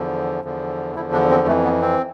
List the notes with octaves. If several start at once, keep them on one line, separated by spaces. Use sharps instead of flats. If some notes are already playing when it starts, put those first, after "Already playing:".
Already playing: E2 D3 F3
E2 D3 F3
E2 D3 F3 E4
D4
C4
F2 E3 A3
B3
C4